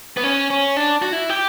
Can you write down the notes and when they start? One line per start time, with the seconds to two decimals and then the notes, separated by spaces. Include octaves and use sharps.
0.17 B3
0.24 C#4
0.50 C#4
0.77 D4
1.02 F#4
1.13 E4
1.29 G4